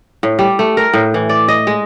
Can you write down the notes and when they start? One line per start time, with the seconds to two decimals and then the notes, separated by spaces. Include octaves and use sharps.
0.23 A2
0.39 G3
0.59 A3
0.77 A#4
0.94 A2
1.14 E3
1.29 D5
1.48 D#5
1.67 G#3